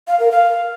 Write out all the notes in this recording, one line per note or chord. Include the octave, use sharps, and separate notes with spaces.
F5
A#4
F5